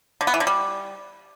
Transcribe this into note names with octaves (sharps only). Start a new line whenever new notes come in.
D3
B3
E3
D3
G3